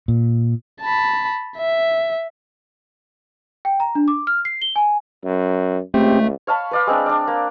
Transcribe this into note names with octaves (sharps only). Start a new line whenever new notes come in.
A#2
A5 B5
E5
G5
A#5
D4
D6
F6
C7
G7
G#5
F#2
C#2 A3 C4 G4
C#5 F5 A5 B5
B4 D5 F5
G#3 C4 D4
D4 D5
A#3